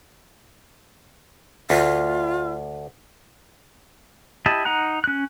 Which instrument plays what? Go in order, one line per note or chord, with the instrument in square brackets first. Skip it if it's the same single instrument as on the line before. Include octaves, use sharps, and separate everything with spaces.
[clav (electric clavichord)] D2 [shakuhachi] F4
[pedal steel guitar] E4 G4 D#5 A5
D#4 F#5 A#5 F#6
C#4 F#6